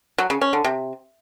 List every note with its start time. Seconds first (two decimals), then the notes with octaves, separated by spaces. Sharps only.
0.18 F#3
0.30 C#3
0.41 C#4
0.53 D3
0.64 C3